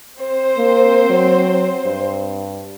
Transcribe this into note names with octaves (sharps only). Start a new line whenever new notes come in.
C4 C5
A#3
F#3
G2